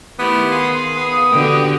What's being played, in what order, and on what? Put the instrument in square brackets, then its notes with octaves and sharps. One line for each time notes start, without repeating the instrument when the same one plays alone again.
[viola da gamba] D#3 [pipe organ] A3 E4 G4 [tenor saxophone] B3
[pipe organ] G#4 F5 G#5 [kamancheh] C6
[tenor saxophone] B3 [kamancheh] D#6
[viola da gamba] D3 F#4 G4 [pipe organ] G5